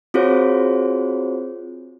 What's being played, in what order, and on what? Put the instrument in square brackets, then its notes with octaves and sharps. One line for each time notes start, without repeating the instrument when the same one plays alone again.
[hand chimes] C4 F4 F#4 G#4 C5 C#5